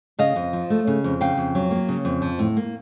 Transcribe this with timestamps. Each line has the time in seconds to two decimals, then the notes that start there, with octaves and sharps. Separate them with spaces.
0.19 C#3 D#5 F5
0.36 F2
0.53 F3
0.70 A3
0.87 C#3
1.04 F2
1.21 C#3 F5 G5
1.38 F2
1.55 F#3
1.71 A#3
1.89 C#3
2.05 F2
2.22 F3
2.39 A2
2.57 A#3